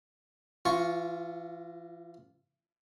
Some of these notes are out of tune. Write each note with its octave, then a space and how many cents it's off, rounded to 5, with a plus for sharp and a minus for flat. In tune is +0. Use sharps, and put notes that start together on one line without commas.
E3 +40 F4 +0 C#6 +0